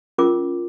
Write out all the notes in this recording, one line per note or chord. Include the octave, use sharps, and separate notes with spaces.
C#4 F4 A#4 D6